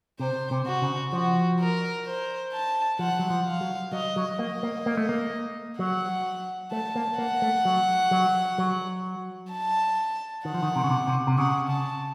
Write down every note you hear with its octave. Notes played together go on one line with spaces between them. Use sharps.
C3 C5
C3
F#4
C#3
F3 F#4
A#4
C5
A5
F3 F#5
F#3
F3
F5
F#3
F#3 D#5
F#3
A#3 D#5
A#3
A#3
A3
A#3
F#3 F#5
A3 A5
A#3
A#3 F#5
A3
F#3
F#3
F#3
A5
D#3 F#5
F3
D#3
C3
C#3
C3
C3
C3
C#3 F#5
A5